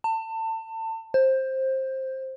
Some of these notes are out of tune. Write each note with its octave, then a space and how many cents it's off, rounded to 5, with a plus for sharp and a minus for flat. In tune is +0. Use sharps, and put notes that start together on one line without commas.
A5 +30
C5 +15